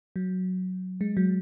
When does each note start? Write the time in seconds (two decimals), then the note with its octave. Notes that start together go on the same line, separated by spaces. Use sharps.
0.16 F#3
1.01 G#3
1.17 F#3